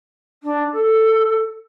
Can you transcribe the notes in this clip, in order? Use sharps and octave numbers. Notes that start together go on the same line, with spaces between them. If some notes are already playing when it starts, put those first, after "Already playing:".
D4
A4